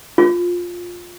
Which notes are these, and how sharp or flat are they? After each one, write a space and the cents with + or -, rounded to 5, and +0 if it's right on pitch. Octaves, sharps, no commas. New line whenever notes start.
F4 +10